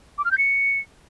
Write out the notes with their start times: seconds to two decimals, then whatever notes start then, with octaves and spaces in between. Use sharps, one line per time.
0.18 D6
0.25 F6
0.31 G6
0.38 C#7